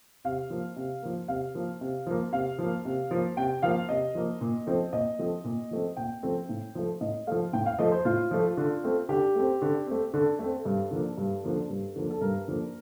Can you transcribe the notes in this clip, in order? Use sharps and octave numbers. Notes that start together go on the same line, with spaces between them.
C3 F5
F3 A#3
C3
F3 A#3
C3 F5
F3 A#3
C3
F3 A#3
C3 F5
F3 A#3
C3
F3 A#3
C3 G5
F3 A#3 F5
C3 D#5
F3 A#3
A#2
F3 A3 C4
A#2 D#5
F3 A3 C4
A#2
F3 A3 C4
A#2 G5
F3 A3 C4
A2
F3 A3
A2 D#5
F3 A3 F5
A2 G5
F5
F3 A3 D#5
C5
A2 F4
F3 A3
D3
A3 C4
D3 G4
A3 C4
D3
A3 C4
D3 A4
A3 C4
G2
D3 F3 A#3
G2
D3 F3 A#3
G2
D3 F3 A#3
A4
G2 A#4
D3 F3 A#3